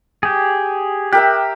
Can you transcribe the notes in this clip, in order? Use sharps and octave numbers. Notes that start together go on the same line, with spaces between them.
G4 G#4
G4 A#4 E5 G5 F#6